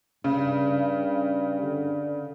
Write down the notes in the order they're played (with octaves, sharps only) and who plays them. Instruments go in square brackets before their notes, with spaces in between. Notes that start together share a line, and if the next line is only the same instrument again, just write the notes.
[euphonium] G2 [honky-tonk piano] C#3
[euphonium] D3